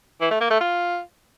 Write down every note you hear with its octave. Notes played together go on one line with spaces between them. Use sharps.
E3
A3
A#3
A3
F4